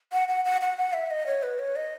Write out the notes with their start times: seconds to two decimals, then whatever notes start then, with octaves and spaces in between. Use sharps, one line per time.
0.13 F#5
0.29 F#5
0.45 F#5
0.61 F#5
0.77 F#5
0.93 E5
1.11 D#5
1.27 C#5
1.43 B4
1.59 C#5
1.76 D#5